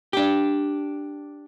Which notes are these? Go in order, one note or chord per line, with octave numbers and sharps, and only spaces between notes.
D4 G4